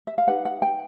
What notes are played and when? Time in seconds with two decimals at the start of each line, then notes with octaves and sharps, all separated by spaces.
0.07 E5
0.18 F5
0.27 D#4 G4 B4 F#5
0.45 F#5
0.62 G5